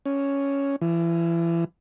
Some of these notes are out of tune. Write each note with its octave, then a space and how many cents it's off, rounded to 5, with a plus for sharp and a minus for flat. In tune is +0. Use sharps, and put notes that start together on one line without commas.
C#4 +5
E3 +35